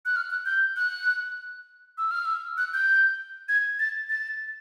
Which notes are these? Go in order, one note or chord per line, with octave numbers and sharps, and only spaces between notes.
F#6
F6
F#6
G6
F#6
E6
F6
E6
F#6
G6
G#6
A6
A6